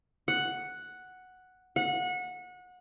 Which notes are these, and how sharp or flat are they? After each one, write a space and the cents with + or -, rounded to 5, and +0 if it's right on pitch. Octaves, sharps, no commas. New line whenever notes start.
F#5 +0
F#5 -25